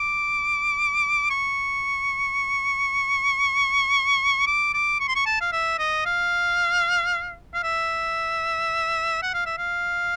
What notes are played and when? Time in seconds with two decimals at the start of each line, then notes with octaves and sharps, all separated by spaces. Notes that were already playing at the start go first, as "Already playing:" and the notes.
Already playing: D6
1.30 C#6
4.47 D6
4.74 D6
5.00 C#6
5.08 C6
5.15 C#6
5.26 A5
5.41 F5
5.52 E5
5.78 D#5
6.05 F5
7.54 F5
7.63 E5
9.22 F#5
9.34 F5
9.46 E5
9.58 F5